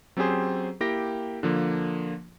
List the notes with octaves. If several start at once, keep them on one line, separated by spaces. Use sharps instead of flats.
F#3 C4 C#4 G4 G#4 C5
A#3 E4 G4 G5 A#6
D3 F3 A#3